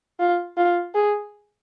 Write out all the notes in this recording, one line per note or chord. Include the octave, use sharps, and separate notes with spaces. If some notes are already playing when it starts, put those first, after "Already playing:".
F4
F4
G#4